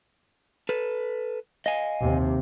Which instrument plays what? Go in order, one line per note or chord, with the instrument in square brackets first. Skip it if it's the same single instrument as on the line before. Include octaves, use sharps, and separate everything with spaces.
[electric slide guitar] A4 B4
D#5 F5 G#5
[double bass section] D#2 C3